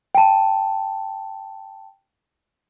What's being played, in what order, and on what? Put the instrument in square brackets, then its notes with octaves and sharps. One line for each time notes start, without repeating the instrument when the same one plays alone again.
[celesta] G5 A5